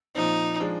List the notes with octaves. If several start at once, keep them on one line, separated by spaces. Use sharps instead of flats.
A#2 F3 C4 D#4
F3 G#3 D4